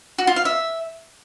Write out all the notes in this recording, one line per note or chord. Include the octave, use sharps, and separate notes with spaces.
F#4
F4
F5
E5